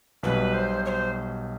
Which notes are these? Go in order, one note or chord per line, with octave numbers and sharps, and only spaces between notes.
B1 B2 G3 B4
C5
C#5
C5